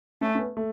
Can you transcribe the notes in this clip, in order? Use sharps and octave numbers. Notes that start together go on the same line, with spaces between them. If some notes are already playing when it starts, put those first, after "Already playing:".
A3 C#4
C#4
B3
A3